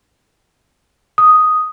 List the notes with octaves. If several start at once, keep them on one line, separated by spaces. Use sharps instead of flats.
D#6